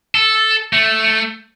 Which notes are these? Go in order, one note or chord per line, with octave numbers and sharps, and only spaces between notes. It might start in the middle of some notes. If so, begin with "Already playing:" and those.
A4
A3